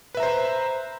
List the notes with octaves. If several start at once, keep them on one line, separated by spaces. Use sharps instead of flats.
B4 C5 E5 A#5